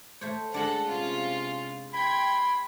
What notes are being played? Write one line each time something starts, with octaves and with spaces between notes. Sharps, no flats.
A3 C5 C#5
G#3 D4 A4 F#5
C3 C#4 F4
G5 B5 C6 G#6